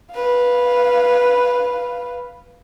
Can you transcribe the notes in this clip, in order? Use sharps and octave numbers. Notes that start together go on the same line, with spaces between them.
B4 F5